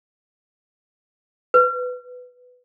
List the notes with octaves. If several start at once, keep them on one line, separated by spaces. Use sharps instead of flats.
B4